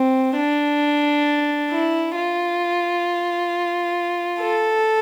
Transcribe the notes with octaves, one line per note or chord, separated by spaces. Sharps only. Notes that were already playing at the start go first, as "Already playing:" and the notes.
Already playing: C4
D4
E4
F4
A4